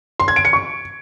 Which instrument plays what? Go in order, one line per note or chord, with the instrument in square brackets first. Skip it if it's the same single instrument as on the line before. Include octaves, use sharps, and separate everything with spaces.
[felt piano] C6
G#6
D7
C#7
C#6